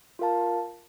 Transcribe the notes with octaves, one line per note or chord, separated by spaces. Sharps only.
F4 A#4 F5 A5